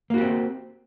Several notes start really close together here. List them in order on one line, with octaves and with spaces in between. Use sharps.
A#3 F#4 G4 C4